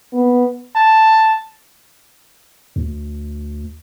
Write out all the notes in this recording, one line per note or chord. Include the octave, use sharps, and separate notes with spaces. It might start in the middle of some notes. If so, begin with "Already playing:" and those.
B3
A5
D2